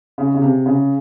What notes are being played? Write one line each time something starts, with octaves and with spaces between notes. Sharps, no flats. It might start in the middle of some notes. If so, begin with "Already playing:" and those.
C#3
C#3
C3
C#3